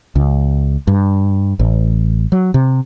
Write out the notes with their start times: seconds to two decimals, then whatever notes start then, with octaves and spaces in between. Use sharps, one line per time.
0.15 C#2
0.87 G2
1.59 A1
2.32 F#3
2.54 C3